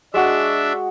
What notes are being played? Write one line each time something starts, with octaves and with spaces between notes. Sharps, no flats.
G#3 D4 F#4 E5